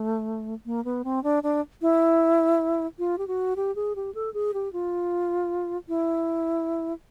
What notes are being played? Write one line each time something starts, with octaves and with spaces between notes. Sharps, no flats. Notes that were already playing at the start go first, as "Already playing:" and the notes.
Already playing: A3
A#3
B3
C4
D4
D4
E4
F4
G4
F#4
G4
G#4
G4
A4
G#4
G4
F4
E4